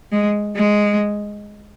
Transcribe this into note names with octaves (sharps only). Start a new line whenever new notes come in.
G#3
G#3